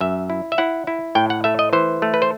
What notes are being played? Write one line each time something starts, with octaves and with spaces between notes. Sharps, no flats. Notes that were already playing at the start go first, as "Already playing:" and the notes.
F#2 E5
E4
E5
E4 F#5
E4
A2 G5
F#5
A3 E5
D#5
E3 C5
A3
B4
C5